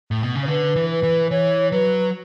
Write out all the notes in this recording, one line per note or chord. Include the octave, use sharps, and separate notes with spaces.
A2
B2
C#3
C#5
D3 B4
E3
B4
E3
E3 C#5
F#3 B4